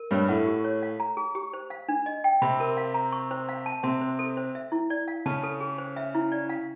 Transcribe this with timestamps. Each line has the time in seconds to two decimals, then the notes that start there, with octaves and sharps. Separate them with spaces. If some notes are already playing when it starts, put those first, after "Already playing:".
Already playing: A#4
0.11 G2 G3 C#5
0.28 A2 A3 F#5
0.47 G4
0.65 C#5
0.83 F5
1.00 A#5
1.17 G#4
1.35 G4
1.53 C5
1.70 F5
1.89 D4
2.06 D#5
2.24 G5
2.42 C3 C4 B5
2.60 A#4
2.77 F5
2.94 A#5
3.12 C#6
3.31 C5
3.49 F5
3.66 A5
3.83 C3 C4 C6
4.01 C5
4.19 A4
4.37 C5
4.55 E5
4.72 E4
4.90 D5
5.08 F5
5.26 C#3 C#4 A5
5.43 A4
5.60 G#4
5.78 C5
5.96 E5
6.15 E4
6.32 D5
6.49 F5